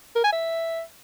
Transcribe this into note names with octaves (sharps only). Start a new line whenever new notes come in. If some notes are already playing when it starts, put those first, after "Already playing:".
A#4
G#5
E5